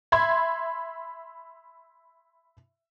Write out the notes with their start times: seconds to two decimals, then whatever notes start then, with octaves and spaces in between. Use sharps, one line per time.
0.12 E5 B5 C6 G#6